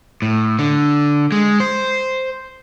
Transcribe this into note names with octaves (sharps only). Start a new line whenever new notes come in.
A2
D3
G#3
C5